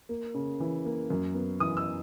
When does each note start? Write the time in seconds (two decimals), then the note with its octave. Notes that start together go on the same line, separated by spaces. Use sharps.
0.09 A#3
0.35 C#3
0.60 E3
0.85 A#3
1.10 F#2
1.35 B3
1.60 E3 D#6
1.77 E6